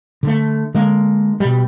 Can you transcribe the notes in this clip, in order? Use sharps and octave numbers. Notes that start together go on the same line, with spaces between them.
D3 A3
D3 G#3 A#3
B2 G3